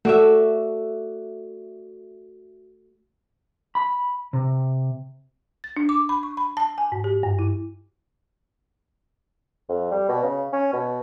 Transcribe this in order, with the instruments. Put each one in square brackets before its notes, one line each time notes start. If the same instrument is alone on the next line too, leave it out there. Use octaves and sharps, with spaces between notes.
[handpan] A3 [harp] F#4 D5 E5
[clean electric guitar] B5
C3
[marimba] A6
D4
D6
B5
C#6
B5
A5
G#5
G#2
G4
G2
E4
[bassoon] F2
G3
B2
C#3
C#4
B2